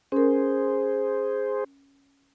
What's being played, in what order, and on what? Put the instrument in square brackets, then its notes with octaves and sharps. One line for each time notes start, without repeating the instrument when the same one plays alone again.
[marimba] C#4 A#4 [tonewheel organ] G#4 C5